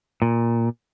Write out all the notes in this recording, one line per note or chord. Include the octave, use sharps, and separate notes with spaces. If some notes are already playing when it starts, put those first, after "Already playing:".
A#2